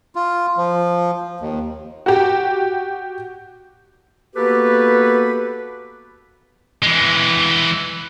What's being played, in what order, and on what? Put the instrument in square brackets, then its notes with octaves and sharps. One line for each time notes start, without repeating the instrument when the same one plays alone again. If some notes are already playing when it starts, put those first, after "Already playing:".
[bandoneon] F4
F3
D#2
[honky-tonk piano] F#4 G4
[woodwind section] A#3 B3 F#4 G4 A4 B4
[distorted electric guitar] E3 G#3